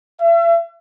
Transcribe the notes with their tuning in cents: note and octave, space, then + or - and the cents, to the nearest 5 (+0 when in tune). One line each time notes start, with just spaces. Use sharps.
E5 +40